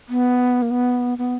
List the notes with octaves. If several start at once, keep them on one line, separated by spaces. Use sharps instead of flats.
B3
A#3
B3
B3